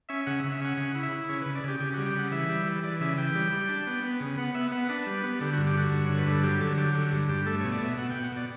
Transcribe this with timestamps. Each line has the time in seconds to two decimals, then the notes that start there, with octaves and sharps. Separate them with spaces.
0.09 C#4 E5
0.26 C#3 F#5
0.39 E5
0.44 C#3
0.51 E5
0.61 C#4 F#5
0.77 C#3
0.91 F#5
0.95 E4
1.03 E5
1.12 E4
1.29 C#3 C#5
1.41 B4
1.46 C#3
1.55 D5
1.64 C#3 G4
1.80 C#3 G4
1.94 F#4
1.98 G3
2.06 G4
2.14 C#3 F#5
2.32 E3 E5
2.49 G3
2.66 E3
2.84 E3 D5
3.00 C#3 E5
3.18 E3 G5
3.35 G3
3.53 G3
3.69 D4
3.87 B3
4.04 B3
4.20 C#3
4.38 B3 F#5
4.55 B3 E5
4.72 B3 F#5
4.89 D4 B4
5.06 G3
5.23 B3
5.41 D3 G4
5.53 F#4
5.58 G2
5.67 G4
5.76 D3 F#4
5.92 G2
6.06 D3 C#5
6.19 B4
6.27 G2 A4
6.43 F#3 G4
6.60 D3 A4
6.78 F#3 G4
6.95 D3 G4
7.12 G2
7.29 G2 G4
7.46 A3 A4
7.60 B2 C#5
7.72 D5
7.81 B2 E5
7.97 B2 F#5
8.10 G5
8.16 B2
8.24 F#5
8.32 B2 D5